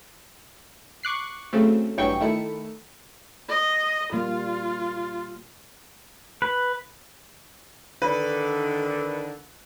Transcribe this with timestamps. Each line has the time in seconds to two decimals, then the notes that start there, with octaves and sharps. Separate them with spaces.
1.03 C#6 D6 F#6 C7
1.53 C#3 F#3 A3 C4
1.97 A1 G2 E3 F#3 G5 C#6
2.21 D#3 A3 E4 C#7
3.49 D#5
4.13 A#2 G3 A#3 F4
6.42 B4
8.02 D3 D#3 B4